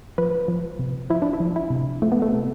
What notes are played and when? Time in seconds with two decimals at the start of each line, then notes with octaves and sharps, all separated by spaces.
0.18 F3 B4
0.48 F3
0.79 C3
1.10 F3 E4
1.22 D4
1.33 E4
1.40 F3
1.56 E4
1.70 C3
2.02 F3 A3
2.12 B3
2.22 A3
2.32 C3